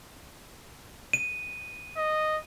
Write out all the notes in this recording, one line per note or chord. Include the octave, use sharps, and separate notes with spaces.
D#7
D#5